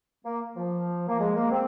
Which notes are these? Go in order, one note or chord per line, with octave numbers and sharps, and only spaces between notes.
A#3
F3
A#3
G#3
A#3
C4